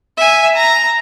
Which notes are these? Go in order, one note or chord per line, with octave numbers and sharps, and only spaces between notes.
E5 G#5
A#5